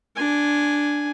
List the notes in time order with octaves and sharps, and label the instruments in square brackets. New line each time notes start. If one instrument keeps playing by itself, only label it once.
[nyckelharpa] D4 G#5